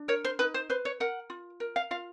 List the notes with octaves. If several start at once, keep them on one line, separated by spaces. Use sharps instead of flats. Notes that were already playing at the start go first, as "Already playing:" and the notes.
Already playing: D4
A#4 C#5
C5
D#4 B4
C5
B4 C5
C#5
A#4 F#5
F4
A#4
F5
F4 F5